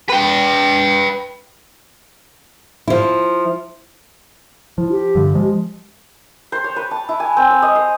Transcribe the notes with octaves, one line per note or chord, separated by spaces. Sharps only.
B4 G5
F3 E4
F3 E4
G4
G2 D3
F3 G#3
C5
C#5
B4
A5
E4
G#5
C4
C#5
D#5
C5